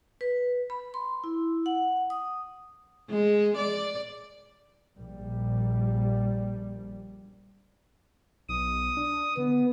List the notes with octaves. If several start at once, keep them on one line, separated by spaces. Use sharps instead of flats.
B4
B5
C6
E4
F#5
D#6
G#3
D5
A#1 G3
B1 D#6
D4
D3 B3